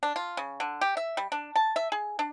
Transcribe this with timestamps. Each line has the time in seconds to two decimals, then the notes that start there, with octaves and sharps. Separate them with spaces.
0.03 D4
0.16 F4
0.37 C#3
0.60 D3
0.81 G4
0.97 E5
1.17 G3
1.32 D4
1.56 A5
1.76 E5
1.92 G#4
2.19 D4